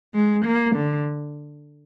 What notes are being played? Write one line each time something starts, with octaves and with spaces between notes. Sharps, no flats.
G#3
A#3
D3